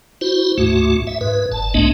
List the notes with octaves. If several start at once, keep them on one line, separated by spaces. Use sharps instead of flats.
E4 F#4 C5
D2 G#2 A3 F#4
E5
G#2 B4
G1 A5
C2 G#2 A3 B3 D4 D#5